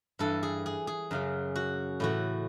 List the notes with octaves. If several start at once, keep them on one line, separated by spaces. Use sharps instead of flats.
G2 E3 A4
G#4
G#4
G#4
F#2 C#3 F#3
F#4
A2 E3 F#4